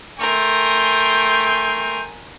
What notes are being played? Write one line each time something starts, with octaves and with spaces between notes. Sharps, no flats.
A3 A#4 G5 G#5 C6